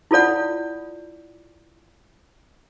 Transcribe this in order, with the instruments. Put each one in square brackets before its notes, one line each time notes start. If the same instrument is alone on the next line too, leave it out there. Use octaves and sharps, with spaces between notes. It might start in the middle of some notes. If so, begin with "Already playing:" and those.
[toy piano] E4 F4 A4 D5 F#5